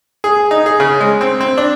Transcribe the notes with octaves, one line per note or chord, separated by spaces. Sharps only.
G#4
D#4
G#4
C#3
G#3
C4
C4
D4